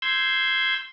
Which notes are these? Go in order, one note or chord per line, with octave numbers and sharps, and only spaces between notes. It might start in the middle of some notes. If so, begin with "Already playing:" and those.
C6 E6 G6 G#6